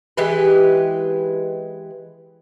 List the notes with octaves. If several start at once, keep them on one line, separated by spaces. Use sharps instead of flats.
E3 G#3 G4 B4